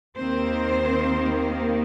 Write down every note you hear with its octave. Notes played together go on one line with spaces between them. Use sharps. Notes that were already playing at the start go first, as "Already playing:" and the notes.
D#2 D#3 A#3 C4 C5